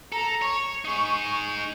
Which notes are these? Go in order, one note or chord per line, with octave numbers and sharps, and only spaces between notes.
A4 A#5
C#5 C#6
D#4 G#4